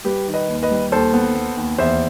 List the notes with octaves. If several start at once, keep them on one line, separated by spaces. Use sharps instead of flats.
G3 G4 B4
D#3
B4 D#5
D#2
B4 D#5
G3
D#2 A4 C5
B3
B3
D#2
E2 C5 E5